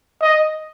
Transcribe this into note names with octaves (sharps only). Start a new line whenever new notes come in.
D#5